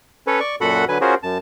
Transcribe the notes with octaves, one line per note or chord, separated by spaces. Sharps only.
C#4 A4 B4 C#5
D5 C#6
F#2 A#2 F#4 A4 F#5 B5
D3 F#3 B4 G#5
C#4 F4 F#4 G#4 A#4 C5
F#2 A5